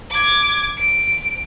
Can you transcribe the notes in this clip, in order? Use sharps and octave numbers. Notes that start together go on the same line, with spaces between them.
D6 G#6
D7